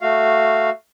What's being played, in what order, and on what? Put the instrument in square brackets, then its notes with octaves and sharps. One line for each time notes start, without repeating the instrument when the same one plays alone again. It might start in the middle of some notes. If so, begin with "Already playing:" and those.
[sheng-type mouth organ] A3 F#4 F5